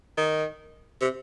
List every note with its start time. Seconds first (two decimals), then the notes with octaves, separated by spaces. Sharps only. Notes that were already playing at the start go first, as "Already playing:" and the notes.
0.17 D#3
1.01 C3